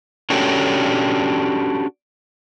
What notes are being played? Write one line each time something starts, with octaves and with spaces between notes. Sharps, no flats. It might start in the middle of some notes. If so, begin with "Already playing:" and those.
C#4 D4 F#4 G4 A4 C#5